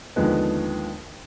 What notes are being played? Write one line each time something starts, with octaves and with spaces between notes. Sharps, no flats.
D#2 D3 F3 G#3 B3